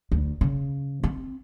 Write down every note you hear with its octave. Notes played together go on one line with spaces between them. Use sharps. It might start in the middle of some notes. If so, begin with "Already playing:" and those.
D2
C#3
C4